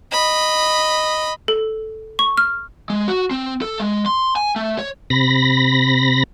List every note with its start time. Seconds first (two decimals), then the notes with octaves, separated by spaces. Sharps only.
0.12 D#5 B5
1.48 A4
2.19 C#6
2.37 F6
2.90 G#3
3.08 F#4
3.31 C4
3.62 A4
3.80 G#3
4.06 C6
4.36 G#5
4.56 A3
4.79 C#5
5.10 C3 B5 A#6